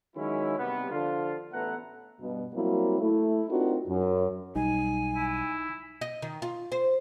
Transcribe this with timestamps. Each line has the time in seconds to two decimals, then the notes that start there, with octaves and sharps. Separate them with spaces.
0.16 D#3 F#3 G#3 C#4 E4
0.58 C3 G3 B3
0.91 D3 F3 F4
1.53 A1 A3 B3 E4 F#5 A#5
2.20 G2 B2
2.54 F#3 G3 A#3 C4 E4 F#4
3.01 A3 E4
3.49 C4 D4 D#4 F4 F#4 A#4
3.88 F#2
4.56 B1 G3 D#4 G#5
5.16 E4
6.01 D#5
6.22 D#3
6.42 F4
6.72 C5